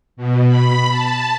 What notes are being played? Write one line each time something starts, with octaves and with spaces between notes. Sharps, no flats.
B2
B5
A5